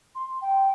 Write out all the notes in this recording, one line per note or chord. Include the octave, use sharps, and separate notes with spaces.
C6
G5